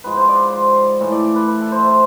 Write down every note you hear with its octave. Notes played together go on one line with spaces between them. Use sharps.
G#2 F3 G#3 B4
C5
D5
C5
A2 E3 A3 E5
D5
D5
B4
B4
A4
C5
E5
C5